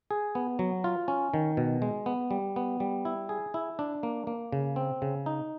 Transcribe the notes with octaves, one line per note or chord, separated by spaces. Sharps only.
G#4
B3
F#3
F4
C#4
D#3
B2
G#3
B3
G3
B3
G3
E4
G#4
E4
D4
A#3
A#3
C#3
C4
C#3
D#4